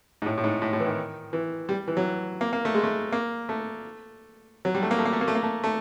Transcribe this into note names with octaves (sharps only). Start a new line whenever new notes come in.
G#2
A2
A2
G#2
A2
A2
E3
D#3
E3
G3
E3
F#3
A#3
A#3
A3
G#3
A3
A#3
A3
F#3
G3
A3
A#3
A3
A#3
A3
A#3
A3
A#3
A3
A3